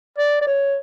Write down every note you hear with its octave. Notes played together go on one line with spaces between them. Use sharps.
D5
D5
C#5